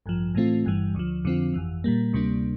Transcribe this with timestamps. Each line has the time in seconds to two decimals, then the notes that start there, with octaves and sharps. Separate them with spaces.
0.06 A1 G2 F3
0.35 A2 E3 A3 C4 F4
0.65 G1 G2 E3 G3
0.94 D2 D3 F3
1.24 F2 D3 F3 C4 F4
1.54 G1 F2 E3
1.84 A#2 G3 A#3
2.13 D2 C3 G3 A#3 D4